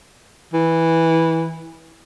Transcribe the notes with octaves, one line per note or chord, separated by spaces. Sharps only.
E3